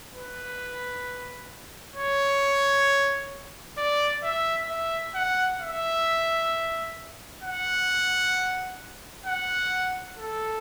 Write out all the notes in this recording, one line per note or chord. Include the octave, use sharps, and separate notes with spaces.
B4
C#5
D5
E5
E5
F#5
E5
F#5
F#5
A4